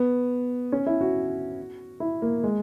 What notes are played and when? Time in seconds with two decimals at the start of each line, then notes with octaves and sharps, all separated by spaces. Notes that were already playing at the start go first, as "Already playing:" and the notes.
Already playing: B3
0.72 C#4
0.86 E4
1.01 F#4
2.00 E4
2.22 A#3
2.44 G#3